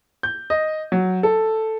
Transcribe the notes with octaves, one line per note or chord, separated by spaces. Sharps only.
G6
D#5
F#3
A4